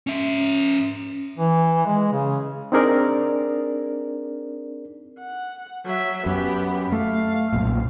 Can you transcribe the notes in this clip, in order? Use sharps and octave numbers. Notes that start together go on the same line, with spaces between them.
C#4 E5
E3
G#3
C#3
C4 D4 D#4 G#4 A#4 D5
F#5
F#3 E5
F#2 B3 G4
A3 F5
B1 F#2 A#2